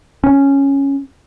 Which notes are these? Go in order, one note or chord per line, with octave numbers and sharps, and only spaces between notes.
C#4